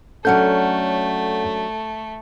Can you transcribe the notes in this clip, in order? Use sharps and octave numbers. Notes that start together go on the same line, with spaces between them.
F#3 A3 C#4 D4 A4 F#5 G6